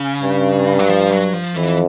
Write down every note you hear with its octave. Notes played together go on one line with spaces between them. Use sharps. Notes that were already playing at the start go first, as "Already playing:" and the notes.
Already playing: C#3
G2
F#3
F3
F#3
F3
F2 E3